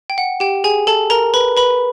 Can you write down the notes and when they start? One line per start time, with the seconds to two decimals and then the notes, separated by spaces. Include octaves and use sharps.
0.10 G5
0.18 F#5
0.40 G4 G5
0.64 G#4 G#5
0.87 A4 A5
1.10 A#4 A#5
1.34 B4 B5
1.57 B4 B5